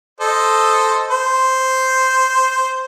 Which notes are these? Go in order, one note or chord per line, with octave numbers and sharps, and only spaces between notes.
A4 C5 D#5
C5